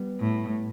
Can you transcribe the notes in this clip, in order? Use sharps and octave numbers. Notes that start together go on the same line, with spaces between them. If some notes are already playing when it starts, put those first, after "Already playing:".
Already playing: G3 B3
A2